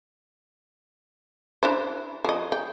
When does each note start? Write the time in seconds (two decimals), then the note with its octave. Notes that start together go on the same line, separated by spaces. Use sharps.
1.63 D4 E4 C5
2.24 F3 D#5
2.52 G5